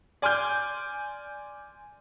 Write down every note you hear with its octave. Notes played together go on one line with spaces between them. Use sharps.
D5 G#5 C6 D6 F6 G6